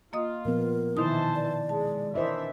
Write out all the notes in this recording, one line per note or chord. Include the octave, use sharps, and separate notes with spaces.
A#3 F4 D#5 D#6
A#2 F3 B3 A#4
B2 D#3 E3 D#4 E4 C5 A5 D#6
D5
G#3 A5
E3 D4 A#4 C5 D#5 E5